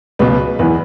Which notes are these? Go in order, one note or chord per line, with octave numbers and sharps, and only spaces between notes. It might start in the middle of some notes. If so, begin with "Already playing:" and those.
C#2 B2 B4
E2 E3 B4